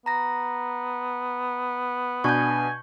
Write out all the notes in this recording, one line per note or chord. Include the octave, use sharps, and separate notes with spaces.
B3 A#5 A#6
B2 D4 G#5 C#6 G6